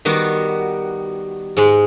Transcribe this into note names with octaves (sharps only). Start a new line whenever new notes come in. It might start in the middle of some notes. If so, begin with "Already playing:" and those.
D#3 G3 B3 F#4
G#2 G#3